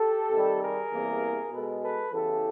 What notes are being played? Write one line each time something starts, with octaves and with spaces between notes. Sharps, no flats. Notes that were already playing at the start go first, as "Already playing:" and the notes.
Already playing: G4 A4
C3 D#3 G3
G#4 A#4
E2 C3 E3 G3 A#3
B2 G#3 A4 B4
A4 B4
E2 C#3 E3 G4 A4